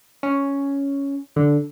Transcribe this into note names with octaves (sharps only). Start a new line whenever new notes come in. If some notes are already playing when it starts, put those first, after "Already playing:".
C#4
D3